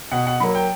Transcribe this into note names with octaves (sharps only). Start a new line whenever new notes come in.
B2 F#5
F#5
F#3 A#3 B5
G5